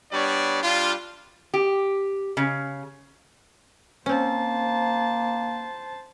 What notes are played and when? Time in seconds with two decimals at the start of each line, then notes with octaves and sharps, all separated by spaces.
0.12 G3 B3 D4 C#5 D5
0.62 G3 D4 F4
1.54 G4
2.37 C#3
4.06 A#3 C4 C#4 C5 A5